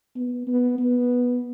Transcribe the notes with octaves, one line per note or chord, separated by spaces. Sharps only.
B3
B3
B3